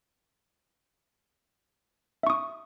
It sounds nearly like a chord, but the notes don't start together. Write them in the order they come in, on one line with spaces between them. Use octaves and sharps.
E5 C#6 D#6